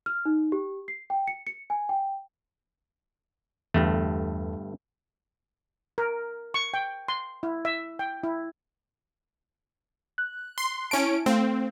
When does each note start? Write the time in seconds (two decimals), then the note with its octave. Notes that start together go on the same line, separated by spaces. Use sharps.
0.06 F6
0.25 D#4
0.52 G4
0.88 C7
1.10 G5
1.28 C#7
1.47 C#7
1.70 G#5
1.89 G5
3.74 G1 E2 G2 A3
5.98 A#4
6.54 C#6
6.74 G5
7.08 C6
7.43 E4
7.65 E5
7.99 G5
8.23 E4
10.18 F#6
10.58 C6
10.91 C#4 E4 A5 D7
11.26 A3 C4 F5